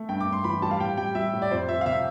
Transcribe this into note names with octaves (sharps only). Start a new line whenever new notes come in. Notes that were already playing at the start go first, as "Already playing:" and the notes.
Already playing: A3
G2 G5
D6
G2
C6
E3 B5
G3 A5
F5
A2 G5
G3 G5
G3 E5
A2
D5
F2 C5
F2 E5
F5
C3 E5